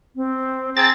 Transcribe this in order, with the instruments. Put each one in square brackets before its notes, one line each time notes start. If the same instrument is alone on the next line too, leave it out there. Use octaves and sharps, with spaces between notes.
[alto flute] C4
[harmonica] C4 G#4 [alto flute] A#5 [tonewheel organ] A6